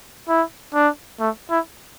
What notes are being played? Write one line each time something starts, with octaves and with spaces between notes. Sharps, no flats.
E4
D4
A3
E4